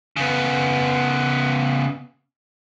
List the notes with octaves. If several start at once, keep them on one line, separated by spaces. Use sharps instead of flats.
C#3 B3